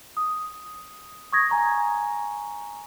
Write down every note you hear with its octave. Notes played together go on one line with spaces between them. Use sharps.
D#6
C#6 D#6 G#6 A#6
G#5 A#5 C#6